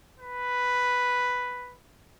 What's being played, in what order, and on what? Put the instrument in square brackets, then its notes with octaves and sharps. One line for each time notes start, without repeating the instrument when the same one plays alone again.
[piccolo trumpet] B4